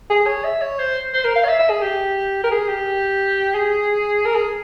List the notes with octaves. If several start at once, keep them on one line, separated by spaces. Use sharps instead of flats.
G#4
C#5
E5
C#5
C5
C5
A#4
F5
C#5
E5
E5
G#4
G4
A#4
G#4
G4
G#4
A#4
G#4